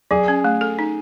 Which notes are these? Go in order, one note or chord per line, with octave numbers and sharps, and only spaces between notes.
F#3 G#4
C#4
A3
A4
D#4